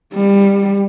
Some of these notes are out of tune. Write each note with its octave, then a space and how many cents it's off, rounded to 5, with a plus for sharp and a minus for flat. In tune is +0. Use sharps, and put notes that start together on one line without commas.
G3 +25